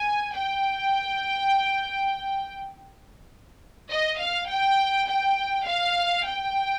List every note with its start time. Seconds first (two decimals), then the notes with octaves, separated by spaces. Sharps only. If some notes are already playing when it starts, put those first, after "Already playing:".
Already playing: G#5
0.35 G5
3.90 D#5
4.20 F5
4.49 G5
5.08 G5
5.66 F5
6.26 G5